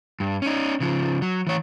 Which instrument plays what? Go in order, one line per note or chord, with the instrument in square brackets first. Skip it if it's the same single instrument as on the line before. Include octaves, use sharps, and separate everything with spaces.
[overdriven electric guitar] G2
C#4 D#4
C#3 F3
F#3
E3 C#5